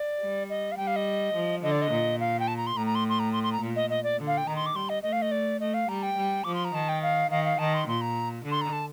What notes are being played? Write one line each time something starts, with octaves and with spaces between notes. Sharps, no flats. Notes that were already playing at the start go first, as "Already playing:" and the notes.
Already playing: D5
G3
D#5
F5
G3 G5
F5
D#5
F3
D3 D#5
D5
D#5
A#2
F5
G5
A5
A#5
C6
A2 A#5
A#5
C6
C6
A#5
C6
C6
A#5
A#2
D#5
D#5
D5
D3
F5
G5
D#3 A#5
C6
D6
G3 C6
D#5
A3 D#5
F5
D#5
D5
A3 D#5
F5
G3 A#5
G5
G3
F3 D6
C6
A#5
D#3 A5
G5
F5
D#3 F5
F5
D#3 A5
C6
A#2 C6
A#5
D3
C6
A#5
A5